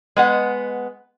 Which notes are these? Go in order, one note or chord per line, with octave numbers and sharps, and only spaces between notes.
G#3 B3 F#5